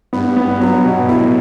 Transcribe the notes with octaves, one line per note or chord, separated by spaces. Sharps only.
G2 B3
B3
G2 F#3
B2
A2 E4